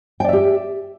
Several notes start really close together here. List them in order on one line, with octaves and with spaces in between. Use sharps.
G5 D5 E5 G4